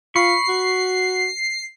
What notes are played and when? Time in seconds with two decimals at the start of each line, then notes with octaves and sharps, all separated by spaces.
0.16 F4 B5 C#6 C7
0.48 F#4